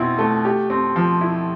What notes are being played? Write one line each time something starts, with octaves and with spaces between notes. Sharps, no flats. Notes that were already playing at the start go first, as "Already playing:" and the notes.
Already playing: B2 C4 E4
A3
G4
C4
F3
E4